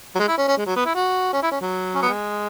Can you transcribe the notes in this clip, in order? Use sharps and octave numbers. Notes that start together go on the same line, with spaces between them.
F#3
G#3
E4
C#4
C#4
G#3
F#3
B3
E4
F#4
C#4
E4
C#4
F#3
C#4
B3
G#3